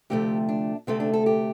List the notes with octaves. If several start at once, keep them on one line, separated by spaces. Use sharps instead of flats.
D2 C3 F3 A3 G4
D4
D2 C3 A3 C4
D4
A4
G4